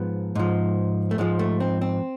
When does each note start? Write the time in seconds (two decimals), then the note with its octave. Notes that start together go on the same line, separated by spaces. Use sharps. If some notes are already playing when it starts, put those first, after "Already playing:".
Already playing: G#2 F3 B3
0.35 G#2 F3
1.11 A3
1.18 G#2 F3 G#3
1.39 A3
1.60 C4
1.81 C4